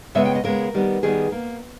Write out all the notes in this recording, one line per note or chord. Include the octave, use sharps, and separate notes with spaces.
C#3 G#3 B3 E5
G5
D#5
C#3 G#3 B3 A#4
D#3 G3 B3
D#3 G3 B3 G#4
A#3